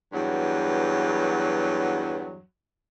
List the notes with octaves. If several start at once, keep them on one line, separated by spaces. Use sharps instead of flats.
E2 G2 F#3